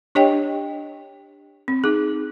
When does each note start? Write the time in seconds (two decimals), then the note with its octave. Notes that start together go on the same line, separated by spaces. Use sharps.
0.15 D4 G4 C#5 D#5 G5
1.68 C4
1.84 D#4 G#4